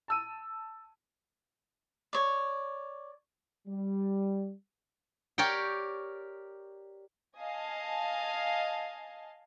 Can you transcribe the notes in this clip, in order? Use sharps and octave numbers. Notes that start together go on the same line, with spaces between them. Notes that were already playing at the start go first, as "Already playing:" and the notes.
A5 E6 D#7
C#5 D5
G3
G4 A#4 C#5 D5 G5
D#5 F5 G#5 A5